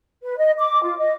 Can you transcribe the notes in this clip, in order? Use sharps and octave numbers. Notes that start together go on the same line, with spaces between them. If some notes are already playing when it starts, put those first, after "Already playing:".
B4
D#5
D6
F4
D#5